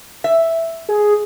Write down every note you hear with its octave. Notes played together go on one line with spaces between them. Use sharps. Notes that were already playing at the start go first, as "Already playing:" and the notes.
E5
G#4